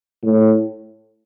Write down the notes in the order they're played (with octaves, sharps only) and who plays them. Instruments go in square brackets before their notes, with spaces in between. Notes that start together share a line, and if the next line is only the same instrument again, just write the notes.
[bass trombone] A2